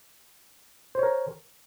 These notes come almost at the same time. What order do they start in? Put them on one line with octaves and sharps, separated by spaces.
C5 C#5 A#4